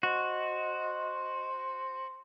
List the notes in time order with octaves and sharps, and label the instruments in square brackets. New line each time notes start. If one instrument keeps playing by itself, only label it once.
[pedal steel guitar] F#4 [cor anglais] C5 [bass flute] D#5